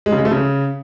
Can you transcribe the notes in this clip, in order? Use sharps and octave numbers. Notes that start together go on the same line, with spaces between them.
G#3
C#3
G#3
A3
C#3